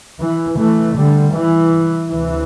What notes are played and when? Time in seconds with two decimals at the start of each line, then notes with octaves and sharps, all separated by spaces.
0.21 E3
0.58 E3 A3
0.96 D3 G3
1.34 E3
2.09 D2 C3 E3